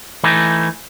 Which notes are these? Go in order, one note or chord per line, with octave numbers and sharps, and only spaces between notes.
E3 A3 D#4